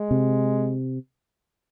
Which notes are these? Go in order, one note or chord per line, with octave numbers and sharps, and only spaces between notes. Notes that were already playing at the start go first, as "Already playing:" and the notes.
Already playing: G#3
C3